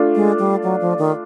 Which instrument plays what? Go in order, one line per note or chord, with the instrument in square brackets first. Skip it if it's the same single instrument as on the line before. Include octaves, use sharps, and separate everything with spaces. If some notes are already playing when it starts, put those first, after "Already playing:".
Already playing: [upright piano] A3 D4 F4
[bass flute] G#3
G3
F#3
F3
D#3